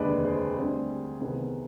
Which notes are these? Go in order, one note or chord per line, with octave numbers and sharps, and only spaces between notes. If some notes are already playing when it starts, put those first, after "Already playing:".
Already playing: F1 D#2 D3 G#3 B4 D5
G#4 C5
D2 D3 G3 C4 G#4 C5
C2 C3 D#3 B3 G#4 C5